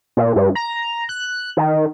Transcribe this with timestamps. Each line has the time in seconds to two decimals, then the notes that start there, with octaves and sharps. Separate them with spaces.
0.17 A#2
0.36 G2
0.55 A#5
1.09 F#6
1.57 D#3